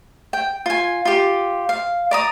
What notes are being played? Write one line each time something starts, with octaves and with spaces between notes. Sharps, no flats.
G5
F4 G#5
F4 G4
F5
D5 A#5 D#6